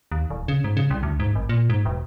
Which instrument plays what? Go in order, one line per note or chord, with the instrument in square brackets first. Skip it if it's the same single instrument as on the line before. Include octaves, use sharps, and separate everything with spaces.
[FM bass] D#2
D1
C#3
G#2
C#3
C2
D2
G#2
G#1
A#2
G#2
E1